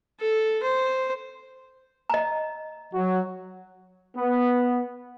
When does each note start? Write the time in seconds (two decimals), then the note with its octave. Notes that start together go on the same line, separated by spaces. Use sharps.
0.21 A4
0.63 C5
2.10 D#5 A#5
2.94 F#3 F#4
4.17 B3